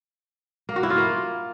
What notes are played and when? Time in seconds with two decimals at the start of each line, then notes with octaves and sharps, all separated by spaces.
0.69 A#3
0.76 F#4
0.83 E4
0.90 F4
0.98 A#3